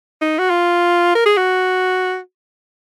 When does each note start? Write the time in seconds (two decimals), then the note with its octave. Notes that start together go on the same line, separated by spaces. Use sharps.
0.22 D#4
0.39 F#4
0.50 F4
1.15 A#4
1.26 G#4
1.37 F#4